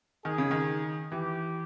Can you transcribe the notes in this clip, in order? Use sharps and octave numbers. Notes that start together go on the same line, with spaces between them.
D#3 G#4
C#3
D#3
E3 G4